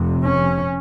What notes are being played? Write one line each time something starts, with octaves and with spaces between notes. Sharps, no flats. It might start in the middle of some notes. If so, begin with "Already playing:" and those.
Already playing: F1 F2 C3
C#4